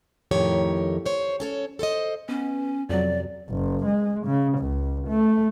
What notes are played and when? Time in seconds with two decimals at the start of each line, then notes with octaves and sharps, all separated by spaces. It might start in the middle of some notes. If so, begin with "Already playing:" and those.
0.31 F2 A2 D#3 G4 A#4 C#5
1.06 C5 C#5
1.40 C#4 A4 C#5
1.79 A4 C5 D5 D#5
2.29 B3 C#4
2.89 F2 C3 F#3 D5
3.50 F#1
3.86 G#3
4.27 C#3
4.59 C#2
5.08 A3